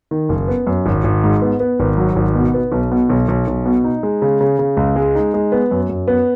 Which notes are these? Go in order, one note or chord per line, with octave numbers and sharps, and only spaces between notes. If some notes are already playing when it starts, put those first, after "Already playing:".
D#3
F#1
B3
F#2
G#1
G#1
G#2
B3
B3
G#1
F#3
G#1
B2
B3
B1
B2
B1
B1
B1
B2
D#4
G#3
C#3
C#3
C#3
C#2
G#3
D#4
G#3
B3
F#2
F#2
B3